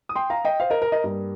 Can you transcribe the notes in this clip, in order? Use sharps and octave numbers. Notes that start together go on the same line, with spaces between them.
D#6
G5 C6
F5 A#5
D#5 G5
C5 F5
A#4 D#5
A#4
A#4 D#5
G2 G3 A#3